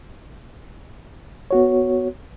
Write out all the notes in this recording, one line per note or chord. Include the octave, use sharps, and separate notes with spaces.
B3 F#4 C#5